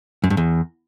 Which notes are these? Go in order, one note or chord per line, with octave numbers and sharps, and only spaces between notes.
F#2
G2
E2